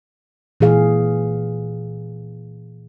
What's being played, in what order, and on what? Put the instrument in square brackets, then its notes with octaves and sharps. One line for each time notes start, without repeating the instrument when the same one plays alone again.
[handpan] A#2 E3 G#4 F5